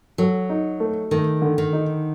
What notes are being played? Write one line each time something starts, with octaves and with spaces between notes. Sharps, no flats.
F#3 A4
D#4
A3
D#3 A3
D3
D#3
D#4